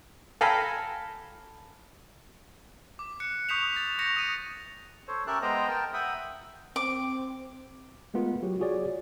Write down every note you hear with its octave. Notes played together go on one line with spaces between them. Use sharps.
A4 F5 G5 G#5 A#5 B5
D6
F#6 C#7
C#6 D#6 G6 B6 E7 F7
A6 F7
C#6 G6 A#6 C#7 E7 F7
D#6 D#7
A4 C5 C#5
C#4 G4 A#4 E5 A5 F#6
G#3 B3 C5 D#5 G5 A#5
A#4 G5 A5
E5 F#5 G5 B5 D#6
C4 D6
G#3 A3 B3 F4 A#4
F#3 F#4 G4
F4 F#4 G#4 C#5 D5